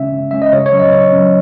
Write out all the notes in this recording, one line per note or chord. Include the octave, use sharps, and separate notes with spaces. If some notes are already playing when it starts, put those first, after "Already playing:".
Already playing: C#3 G#3 C#4 E5
C#3
G#3 C#4 E5
D#5
C#3 C#5
C#5
F#3 C#4
D#5
C#3 C#5
F#3 C#4